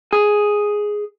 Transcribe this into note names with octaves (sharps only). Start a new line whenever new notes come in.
G#4